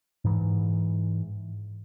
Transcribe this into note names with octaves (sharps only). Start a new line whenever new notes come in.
G#2 E3